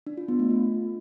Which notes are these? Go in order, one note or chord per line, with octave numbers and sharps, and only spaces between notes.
D4
F4
B3
A3
F4